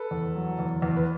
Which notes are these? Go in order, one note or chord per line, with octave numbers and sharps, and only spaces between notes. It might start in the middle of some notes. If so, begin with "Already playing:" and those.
Already playing: A4 B4
E2
F#3
E2
E2
B4